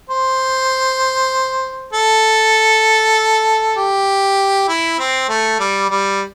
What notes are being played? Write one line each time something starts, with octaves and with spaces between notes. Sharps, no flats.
C5
A4
G4
E4
C4
A3
G3
G3